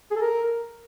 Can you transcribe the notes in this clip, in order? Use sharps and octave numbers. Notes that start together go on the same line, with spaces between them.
G#4
A4
A#4